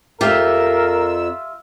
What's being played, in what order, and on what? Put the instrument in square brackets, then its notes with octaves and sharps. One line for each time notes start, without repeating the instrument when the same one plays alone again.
[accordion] F2 E6 [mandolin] F4 E5 [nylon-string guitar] G4 [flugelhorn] A#4